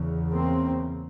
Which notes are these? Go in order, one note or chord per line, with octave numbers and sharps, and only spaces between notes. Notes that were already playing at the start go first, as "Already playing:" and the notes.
Already playing: E2 C#3
A#3 C4